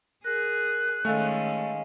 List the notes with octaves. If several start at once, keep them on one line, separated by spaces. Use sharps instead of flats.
G#4 A#4 F#6
D#3 G#3 A3 C#4 A4 D#5 F5 G#5